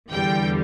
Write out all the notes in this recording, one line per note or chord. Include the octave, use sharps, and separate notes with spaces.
E2 D3 G3 G5